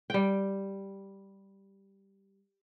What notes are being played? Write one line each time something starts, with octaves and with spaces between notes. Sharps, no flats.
G3 G5